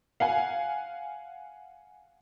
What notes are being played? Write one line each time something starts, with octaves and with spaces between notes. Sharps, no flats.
F5 F#5 G#5